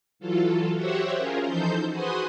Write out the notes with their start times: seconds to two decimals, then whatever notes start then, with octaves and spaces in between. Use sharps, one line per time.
0.19 E3 F#3 F4 A4
0.76 F#4 G4 C5 C#5 E5 F#5
1.15 C#4 F4 G#4 A#4
1.43 E3 F3 D#4 A4 C5 G6
1.90 F#4 G#4 B4 C5 C6 D#6